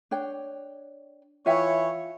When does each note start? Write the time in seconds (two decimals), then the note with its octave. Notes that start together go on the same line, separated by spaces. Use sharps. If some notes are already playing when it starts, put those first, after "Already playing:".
0.11 D4 C#5 G5
1.46 E3 E4 F4 C#5 E5 G5